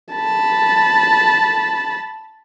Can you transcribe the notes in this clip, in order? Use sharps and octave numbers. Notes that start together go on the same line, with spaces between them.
A5 B5